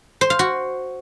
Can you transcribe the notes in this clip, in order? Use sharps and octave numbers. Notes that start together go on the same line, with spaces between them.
C5
F5
F#4